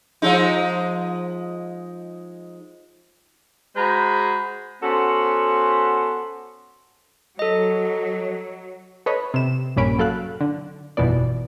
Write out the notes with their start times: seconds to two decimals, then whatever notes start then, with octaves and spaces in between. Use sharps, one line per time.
0.22 F3 G#3 D#4
3.76 G#3 F#4 C5 A#5 B5
4.82 B3 C#4 F#4 A4 C5
7.39 F#3 A4 D#5
9.06 A4 B4 C#5 D#5 B5
9.34 C3 E7
9.76 A#1 G2 A#2 C#4 B5 D7
9.99 F#3 A4 F5 F#6
10.41 D3
10.97 G1 F2 B2 E3 B3 D5